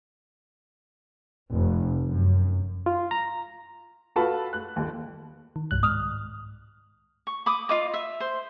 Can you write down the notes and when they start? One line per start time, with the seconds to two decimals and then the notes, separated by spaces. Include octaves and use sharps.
1.52 F1
2.08 F#2
2.86 F4
3.11 A#5
4.16 F4 F#4 A4 B4 A5
4.53 F#6
4.76 G1 D#2
5.56 D#3
5.71 C2 G2 F#6
5.83 G#2 D#6 F6
7.27 C#6
7.46 B5 D6 D#6
7.69 F4 D#5 D6
7.94 E5
8.20 C5